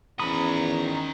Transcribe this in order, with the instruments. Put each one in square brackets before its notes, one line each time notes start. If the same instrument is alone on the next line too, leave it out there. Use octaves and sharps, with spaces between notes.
[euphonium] E2 [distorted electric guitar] D#3 B5 [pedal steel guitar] C#4 D#6 [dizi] A#5